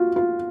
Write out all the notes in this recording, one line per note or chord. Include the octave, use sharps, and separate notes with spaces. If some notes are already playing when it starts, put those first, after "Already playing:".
Already playing: F4 F#4
F4